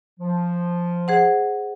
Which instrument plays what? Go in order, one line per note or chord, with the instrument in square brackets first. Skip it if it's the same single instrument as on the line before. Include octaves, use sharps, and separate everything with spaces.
[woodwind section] F3
[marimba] G#4 C5 F#5